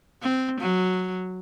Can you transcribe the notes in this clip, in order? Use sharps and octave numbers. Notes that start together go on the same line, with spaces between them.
C4
F#3